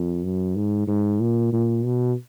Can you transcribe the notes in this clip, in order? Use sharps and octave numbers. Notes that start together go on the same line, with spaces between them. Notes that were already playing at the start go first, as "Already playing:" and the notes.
Already playing: F2
F#2
G#2
G#2
A#2
A#2
B2